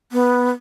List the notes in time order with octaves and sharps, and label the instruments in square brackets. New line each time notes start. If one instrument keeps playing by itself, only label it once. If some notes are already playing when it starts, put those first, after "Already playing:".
[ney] B3